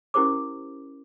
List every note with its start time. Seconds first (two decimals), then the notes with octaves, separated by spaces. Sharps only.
0.14 C#4 E4 G4 A#4 C5 D6